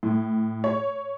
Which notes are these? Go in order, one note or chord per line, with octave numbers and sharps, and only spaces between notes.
A2
C#5